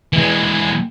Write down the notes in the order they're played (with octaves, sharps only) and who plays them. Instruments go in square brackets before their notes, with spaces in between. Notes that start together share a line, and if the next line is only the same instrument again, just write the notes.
[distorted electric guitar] E3 G#3